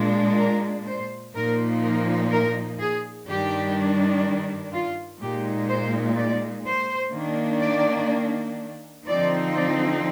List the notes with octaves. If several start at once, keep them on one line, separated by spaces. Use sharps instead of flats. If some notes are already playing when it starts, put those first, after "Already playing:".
Already playing: A#2 G#3 D4
A#4
C5
A#2 F3 A#3 D#4 A#4
A#4
A#4
G#4
G2 D#3 G3 D4 G4
F4
A#2 G#3 D#4 G4
C5
D5
C5
D#3 A#3 D4
D5
D3 F3 C4 D#4 D5
D5